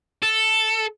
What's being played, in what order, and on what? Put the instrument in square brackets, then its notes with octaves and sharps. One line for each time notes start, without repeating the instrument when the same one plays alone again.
[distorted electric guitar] A4